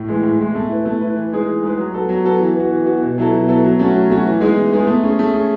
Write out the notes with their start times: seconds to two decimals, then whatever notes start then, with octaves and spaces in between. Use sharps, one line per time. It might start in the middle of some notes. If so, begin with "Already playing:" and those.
Already playing: A2
0.08 E3 G#3
0.23 A2
0.40 E3 G#3
0.55 A3
0.69 E4 B4
0.85 A3
1.01 E4 B4
1.16 E3
1.32 G#3 D#4 G#4 B4
1.47 E3
1.63 G#3 D#4 G#4 B4
1.78 F#3
1.94 B3 F#4 A4
2.09 F#3
2.25 B3 F#4 A4
2.40 E3
2.56 B3 F#4
2.72 E3
2.86 B3 F#4
3.02 B2
3.18 F#3 B3 E4 A4
3.33 B2
3.48 F#3 B3 E4 A4
3.64 F#3
3.79 A3 C#4 F#4
3.95 F#3
4.10 A3 C#4 F#4
4.26 E3
4.41 G#3 B3 D#4 G#4
4.56 E3
4.72 G#3 B3 D#4 G#4
4.87 A3
5.04 C#4 G#4
5.19 A3
5.34 C#4 G#4